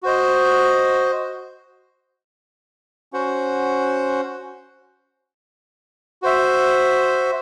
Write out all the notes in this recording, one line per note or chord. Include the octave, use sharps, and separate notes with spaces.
F#4 C5 D#5
C#4 F#4 C5 F#5
F#4 C5 E5